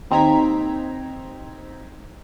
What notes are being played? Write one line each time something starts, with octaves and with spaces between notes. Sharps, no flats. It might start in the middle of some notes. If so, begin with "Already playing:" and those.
D#2 C4 D#4 A#5 G#6 B6